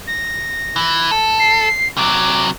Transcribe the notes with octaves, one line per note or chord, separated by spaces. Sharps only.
A#6
E3
A4
C7
C3 F#3 D6